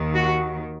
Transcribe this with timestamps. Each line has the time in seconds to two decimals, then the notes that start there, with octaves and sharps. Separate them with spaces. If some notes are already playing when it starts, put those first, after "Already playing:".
Already playing: D#2 D#3
0.15 F#4